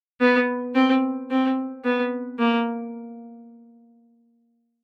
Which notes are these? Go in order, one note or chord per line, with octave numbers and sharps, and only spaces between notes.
B3
C4
C4
B3
A#3